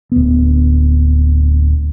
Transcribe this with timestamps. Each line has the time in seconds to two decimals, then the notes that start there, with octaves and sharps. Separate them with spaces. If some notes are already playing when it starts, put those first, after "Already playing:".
0.12 D1 B3